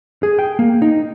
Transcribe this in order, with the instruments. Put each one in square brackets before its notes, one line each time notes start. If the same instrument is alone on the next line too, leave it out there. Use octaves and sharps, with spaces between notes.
[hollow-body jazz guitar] G#4
G5
A#3
D#4